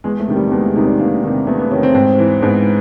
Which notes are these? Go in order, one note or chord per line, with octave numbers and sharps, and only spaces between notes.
E2 G#3
A3
C3 D#3
G3
E2 G#3
A3
C3 D#3 D#4
D4
E2 A#3
C3 D#3
E2 A3
B3
C3 D#3 C#4
C4
G#2 C4
E3
G#2 B3